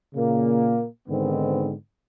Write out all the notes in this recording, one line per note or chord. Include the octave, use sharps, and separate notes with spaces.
A#2 C#3 A#3
G#2 D3 D#3 B3 C4